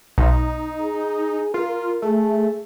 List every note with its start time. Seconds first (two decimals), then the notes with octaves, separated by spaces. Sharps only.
0.18 B1 D#4
0.81 G#4
1.54 F4 A#4
2.02 A3 G#4